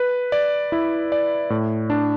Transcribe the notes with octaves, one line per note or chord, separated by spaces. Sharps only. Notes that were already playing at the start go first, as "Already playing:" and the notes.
Already playing: B4
D5
E4
D5
A2
D4